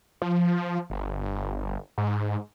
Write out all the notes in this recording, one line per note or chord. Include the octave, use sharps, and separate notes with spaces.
F3
G1
G#2